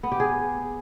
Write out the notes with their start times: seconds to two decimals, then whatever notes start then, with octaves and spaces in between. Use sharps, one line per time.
0.03 B3
0.12 G4
0.20 G#4